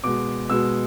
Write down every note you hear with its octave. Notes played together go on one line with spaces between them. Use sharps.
B2 G#3 D6
B2 G#3 E6